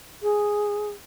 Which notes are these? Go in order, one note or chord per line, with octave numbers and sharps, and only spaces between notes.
G#4